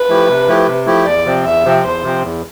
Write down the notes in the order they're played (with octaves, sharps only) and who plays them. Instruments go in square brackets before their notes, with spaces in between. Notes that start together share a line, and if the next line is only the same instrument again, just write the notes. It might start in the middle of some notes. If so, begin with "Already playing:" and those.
Already playing: [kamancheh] B4
[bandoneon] F3 A3 E4 G4
C3
F3 A3 E4 G4
C3
F3 A3 E4 G4
[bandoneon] E2 [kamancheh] D5
[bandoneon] C3 F3 C4
[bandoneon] E2 [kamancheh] E5
[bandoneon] C3 F3 C4
[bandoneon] E2 [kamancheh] C5
[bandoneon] C3 F3 C4
E2